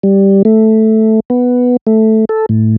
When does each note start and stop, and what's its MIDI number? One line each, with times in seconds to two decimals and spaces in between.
0.03 0.42 55
0.45 1.20 57
1.30 1.77 59
1.87 2.25 57
2.29 2.46 69
2.49 2.76 45